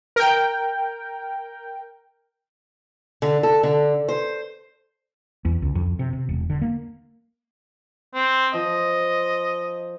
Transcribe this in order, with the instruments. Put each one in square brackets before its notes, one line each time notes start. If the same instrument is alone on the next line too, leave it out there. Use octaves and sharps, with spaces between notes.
[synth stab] A#4 G5
[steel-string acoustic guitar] D3
A4
D3
C5
[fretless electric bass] E2
C#2
F2
C3
C3
E1
D3
A#3
[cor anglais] C4
[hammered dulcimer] F3 [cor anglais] D#5